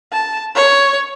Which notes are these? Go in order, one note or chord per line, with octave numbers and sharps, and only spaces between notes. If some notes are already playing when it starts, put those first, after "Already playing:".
A5
C#5